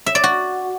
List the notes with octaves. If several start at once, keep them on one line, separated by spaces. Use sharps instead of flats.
E5
D5
F#4